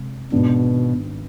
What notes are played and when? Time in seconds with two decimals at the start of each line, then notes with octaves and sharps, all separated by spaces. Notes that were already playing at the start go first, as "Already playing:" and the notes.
Already playing: C3 G#3
0.32 G#1 G#2 B2 D#3 B3 D4